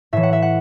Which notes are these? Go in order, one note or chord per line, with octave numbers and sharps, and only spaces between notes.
A2 E3 E5
F#5
E5
F#5